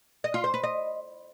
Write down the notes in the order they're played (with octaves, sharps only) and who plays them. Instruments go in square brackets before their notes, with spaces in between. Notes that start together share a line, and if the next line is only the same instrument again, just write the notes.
[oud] D#5
F4
C5
B4
D#5